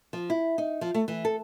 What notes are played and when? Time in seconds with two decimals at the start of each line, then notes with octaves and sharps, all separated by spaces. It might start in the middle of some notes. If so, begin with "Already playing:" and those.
0.13 F3
0.30 E4
0.58 D#4
0.81 F3
0.94 A3
1.08 E3
1.25 A4